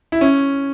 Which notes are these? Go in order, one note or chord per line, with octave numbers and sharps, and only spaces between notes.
E4
C#4